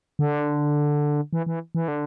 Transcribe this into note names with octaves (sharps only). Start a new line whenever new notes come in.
D3
E3
E3
E3
D3